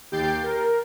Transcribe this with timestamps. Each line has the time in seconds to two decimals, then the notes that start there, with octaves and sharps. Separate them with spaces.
0.12 D#2 G4 G5 G6 A6 C7
0.43 A#4